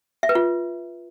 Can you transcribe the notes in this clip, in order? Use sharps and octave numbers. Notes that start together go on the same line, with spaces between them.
E5
B4
F4